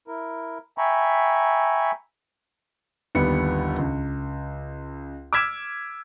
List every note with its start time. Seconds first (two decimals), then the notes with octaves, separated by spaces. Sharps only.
0.08 E4 A#4
0.78 E5 G5 G#5 A#5 B5 C#6
3.15 G1 D#2 G3 B3 C#7
3.78 C#2
5.33 D6 E6 F6 G#6 B6 E7